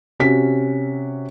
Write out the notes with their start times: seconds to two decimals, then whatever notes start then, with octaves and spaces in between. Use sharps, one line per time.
0.20 C3 C#4 F#4 B6